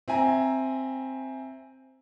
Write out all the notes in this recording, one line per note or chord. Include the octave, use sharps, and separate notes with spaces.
C4 E5 G#5 A#5